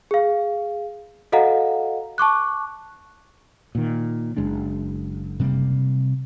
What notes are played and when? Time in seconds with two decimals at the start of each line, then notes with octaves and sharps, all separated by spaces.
0.11 G#4 F5
1.32 F#4 A4 D#5 F5 F#5 A#5
2.18 A5 C#6 D6 F#6
3.75 A#2 D#3
4.37 F#1 G#3 D4
5.40 C3 G3 A#3